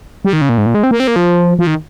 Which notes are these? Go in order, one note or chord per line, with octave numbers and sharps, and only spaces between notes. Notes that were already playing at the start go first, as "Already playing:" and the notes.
G3
D#3
C#3
A#2
G#2
A#2
G#3
C4
A#3
C4
A#3
F3
F3
D#3